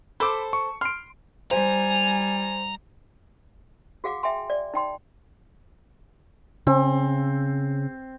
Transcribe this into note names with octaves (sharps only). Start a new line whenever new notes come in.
A4 C5 B5 D6
C#6
C6 F6 D7
G3 C5 G#5 A#5
F#4 G#4 F5 F#5 D6
E5 G5 G#5 C6
D5
D#4 G5 C6
C#3 C4